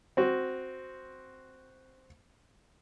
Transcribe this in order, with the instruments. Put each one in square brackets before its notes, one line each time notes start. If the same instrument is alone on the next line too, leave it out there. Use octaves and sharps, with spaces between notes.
[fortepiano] C4 F#4